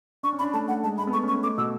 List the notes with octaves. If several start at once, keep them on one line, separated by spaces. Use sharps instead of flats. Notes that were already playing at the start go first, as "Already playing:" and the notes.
D4 C#6
C#4
D4 B5
A3 A5
A3 F#5
G#3 A5
G#3 B5
B3
A3 C#6
C#4
C#6
B3
A3 D6
B2 E6